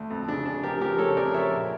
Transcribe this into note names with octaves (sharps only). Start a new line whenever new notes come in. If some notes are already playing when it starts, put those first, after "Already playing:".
Already playing: D2
F2
C#3 D4
C#3 D4
F3 G4 A#4
F3 G4 A#4
C#3 A4 C#5
F2 A#4 D5
F3 C#5 E5
A#1